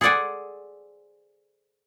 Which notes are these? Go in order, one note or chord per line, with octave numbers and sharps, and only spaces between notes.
G#4 A4 C5 D5 F#5 G#5